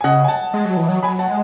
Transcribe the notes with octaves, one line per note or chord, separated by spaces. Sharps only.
G#5
C#3 D#5 F#5
G#5
F#5 A5
G#3
F#3
E3
F#3
F#3 G#5 B5
F#5 A5
G#3